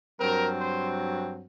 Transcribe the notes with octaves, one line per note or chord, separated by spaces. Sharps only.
G2 F#3 C4 A#4
C5